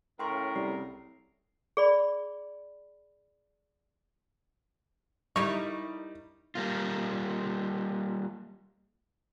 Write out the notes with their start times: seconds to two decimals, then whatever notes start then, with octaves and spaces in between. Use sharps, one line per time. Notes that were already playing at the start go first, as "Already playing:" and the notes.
0.19 A2 C#3 A#4 G5 C6 C#6
0.56 C2 G3 C7
1.77 G#4 D5 B5
5.36 G3 D#4 E4 A#4 C#6
6.55 G3 A#3 F4